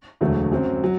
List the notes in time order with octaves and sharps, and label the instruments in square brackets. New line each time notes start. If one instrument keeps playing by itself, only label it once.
[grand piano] E1 D2 D3 F#3 A3
F#2 F#3 C4
F#3